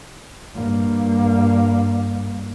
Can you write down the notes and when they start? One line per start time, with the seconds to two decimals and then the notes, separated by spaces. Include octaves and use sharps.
0.54 G2 A#3